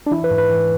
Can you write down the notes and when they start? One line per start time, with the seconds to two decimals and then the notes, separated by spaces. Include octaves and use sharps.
0.07 D4
0.11 E3 E4
0.24 B4
0.31 G#2
0.38 B4
0.51 E3